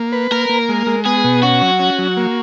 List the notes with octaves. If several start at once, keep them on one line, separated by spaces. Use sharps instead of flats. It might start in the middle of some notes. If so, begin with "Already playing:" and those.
Already playing: A#3
B4
A#3 A#4
A#3
G#3
G#3
B3 G#4
B2
C#4 F#4
F#3
C#4
F#3
A#3